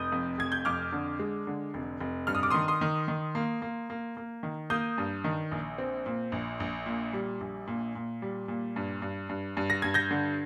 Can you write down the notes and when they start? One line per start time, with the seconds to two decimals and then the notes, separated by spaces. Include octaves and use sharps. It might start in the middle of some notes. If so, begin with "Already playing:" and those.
Already playing: F1 D#6 G6
0.12 F2
0.38 F1 G#6
0.52 G6
0.65 F2 D6 F6
0.92 D3
1.19 G#3
1.47 D3
1.74 F1
2.00 F1
2.27 G2 F6
2.35 D#6
2.43 D6
2.51 D#3 C6 D#6
2.68 C6 D#6
2.81 D#3
3.08 D#3
3.35 A#3
3.62 A#3
3.90 A#3
4.17 A#3
4.43 D#3
4.70 A#3 D#6 G6
4.98 G2
5.24 D#3
5.51 A#1
5.78 C4
6.06 A#2
6.32 A#1
6.60 A#1
6.86 A#2
7.13 G3
7.41 A#1
7.67 A#2
7.95 A#2
8.22 G3
8.48 A#2
8.76 G2
9.02 G2
9.29 G2
9.57 G2
9.70 A#6
9.82 G2 G#6
9.94 G6 A#6
10.11 D3